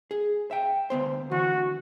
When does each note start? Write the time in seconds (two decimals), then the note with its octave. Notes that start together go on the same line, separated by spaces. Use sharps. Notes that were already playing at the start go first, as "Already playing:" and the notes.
0.11 G#4
0.51 E5 G5
0.90 D2 B3 C5
1.31 D2 E3 F#4